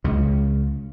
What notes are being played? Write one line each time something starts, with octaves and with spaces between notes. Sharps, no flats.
C#2 C#3